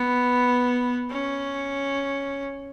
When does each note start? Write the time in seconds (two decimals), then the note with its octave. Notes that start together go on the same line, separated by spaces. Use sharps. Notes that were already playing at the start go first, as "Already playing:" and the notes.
Already playing: B3
1.11 C#4